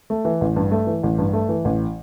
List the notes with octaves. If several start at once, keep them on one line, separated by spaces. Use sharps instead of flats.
A3
E3
A1
G2
A3
E3
A1
G2
A3
E3
A1